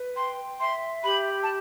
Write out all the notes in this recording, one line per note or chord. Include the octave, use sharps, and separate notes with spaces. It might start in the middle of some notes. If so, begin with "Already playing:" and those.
Already playing: B4
G5 C6
E5 C6
G4 B5
A5